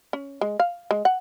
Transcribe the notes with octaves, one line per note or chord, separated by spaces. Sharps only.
C#4
G#3
F5
G#3
F#5